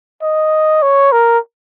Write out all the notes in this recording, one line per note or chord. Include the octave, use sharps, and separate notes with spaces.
D#5
C#5
A#4